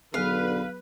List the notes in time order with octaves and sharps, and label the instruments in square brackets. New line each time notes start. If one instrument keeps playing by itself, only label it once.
[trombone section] B1 D3 [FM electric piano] F#3 B3 G#4 [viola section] B4 [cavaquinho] F5